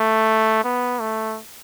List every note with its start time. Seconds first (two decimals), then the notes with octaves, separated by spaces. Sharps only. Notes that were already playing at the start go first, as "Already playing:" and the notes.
Already playing: A3
0.64 B3
1.00 A3